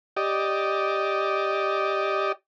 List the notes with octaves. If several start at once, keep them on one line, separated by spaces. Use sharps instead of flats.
G4 D5 D#5